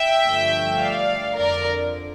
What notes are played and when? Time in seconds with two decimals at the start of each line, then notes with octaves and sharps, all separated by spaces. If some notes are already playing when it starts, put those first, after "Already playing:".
Already playing: E5 G5
0.25 G2 D3 F3 A3
0.80 D5 F5
1.37 F2 D3 A#4 D5